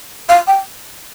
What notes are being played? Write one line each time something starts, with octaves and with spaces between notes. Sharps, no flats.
F5
G5